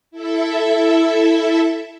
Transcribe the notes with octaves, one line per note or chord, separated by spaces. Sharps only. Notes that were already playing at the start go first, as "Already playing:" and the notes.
E4 A4 E5